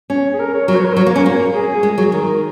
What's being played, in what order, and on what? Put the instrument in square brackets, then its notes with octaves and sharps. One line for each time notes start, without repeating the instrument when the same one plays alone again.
[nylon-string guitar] C#4
[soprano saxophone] G#4
A#4
C#5
[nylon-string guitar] F#3 [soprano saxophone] A#4
[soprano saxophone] C#5
A#4
C#5
[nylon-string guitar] F#3
[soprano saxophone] A#4
[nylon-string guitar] A#3
[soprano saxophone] C#5
[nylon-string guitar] C#4
[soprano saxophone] A#4
[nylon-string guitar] A#3
[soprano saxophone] G#4
[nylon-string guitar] G#3
F#3
[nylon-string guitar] D#3 [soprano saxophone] A#4